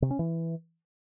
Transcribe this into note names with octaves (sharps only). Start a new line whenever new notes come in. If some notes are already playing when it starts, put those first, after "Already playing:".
C3
C#4
E3